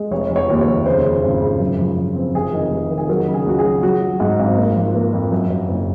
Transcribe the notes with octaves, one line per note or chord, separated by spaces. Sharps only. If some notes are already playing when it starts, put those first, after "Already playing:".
Already playing: G#3
F1 C#5
F1
C#5
D#2
C#5
F1
C#3 C5
C#3
G#1
C#3
F#2
F3
F3
C4
F1 G#4
D#3
F1
D#3
G#4
F#3 A#4
C#3
G#4
C#2 F#4
G#4
F#3
F#3 F#4
F#3
G#2
G#1
A#3
F3
A#3
F2
F#2
F#2
F#1